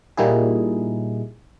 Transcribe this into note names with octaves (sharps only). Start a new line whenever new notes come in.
A#2 G3 D#4 E4 G#4